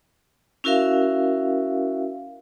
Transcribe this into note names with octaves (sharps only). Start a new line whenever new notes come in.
C#4 E4 F#4 A#4 E5 F5